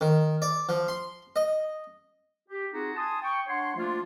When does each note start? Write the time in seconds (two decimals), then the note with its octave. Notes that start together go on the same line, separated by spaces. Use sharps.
0.01 D#3
0.42 D5
0.69 F3
0.88 C6
1.36 D#5
2.49 G4
2.73 C4 D#4 F4 F#4 G#4
2.96 G#5 A5 C6 D#6
3.23 G5 C#6
3.48 D4 C#5 F#5 C6
3.76 F3 A3 A#3 D4 F4